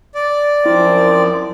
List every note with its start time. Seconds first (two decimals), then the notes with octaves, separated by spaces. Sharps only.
0.15 D5
0.66 F#2 F3 C4 E4